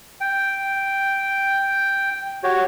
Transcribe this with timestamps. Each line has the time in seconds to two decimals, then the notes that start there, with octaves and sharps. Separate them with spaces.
0.20 G5
2.44 F#4 G4 C#5